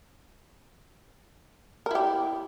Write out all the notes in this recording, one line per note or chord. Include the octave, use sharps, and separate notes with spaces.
E4 G4 A#4